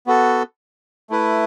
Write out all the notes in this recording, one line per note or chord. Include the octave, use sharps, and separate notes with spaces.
B3 F#4 A4
A3 E4 B4